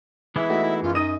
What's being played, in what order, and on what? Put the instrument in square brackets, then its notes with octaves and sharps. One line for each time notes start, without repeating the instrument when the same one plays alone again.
[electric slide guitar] E3 G#3 B3 [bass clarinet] E4 [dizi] E5
[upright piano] A3 D#4 F#4
[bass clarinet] E4
[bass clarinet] F#2 [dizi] F4
[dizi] D#4 [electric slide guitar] D#5 [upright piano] D#6 D#7